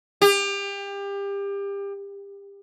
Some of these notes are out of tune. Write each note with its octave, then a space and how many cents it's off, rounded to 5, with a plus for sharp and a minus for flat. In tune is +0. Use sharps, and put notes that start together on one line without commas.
G4 +30